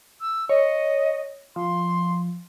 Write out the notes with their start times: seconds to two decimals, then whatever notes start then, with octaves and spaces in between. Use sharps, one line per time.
0.21 E6
0.49 C#5 D#5
1.56 F3 C6